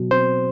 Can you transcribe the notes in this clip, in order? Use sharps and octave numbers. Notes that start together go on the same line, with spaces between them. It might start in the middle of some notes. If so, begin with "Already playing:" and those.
Already playing: B2 F#3
C4 C5